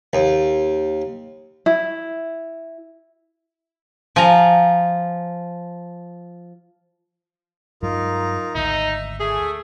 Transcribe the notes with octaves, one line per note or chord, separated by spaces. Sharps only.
D#2
E4
F3 G#5 A#5
G2 F#3 G#3 D#4 F4 A#4
G#1 D2 G#2 D#4 E5
A3 G#4 E5 G#5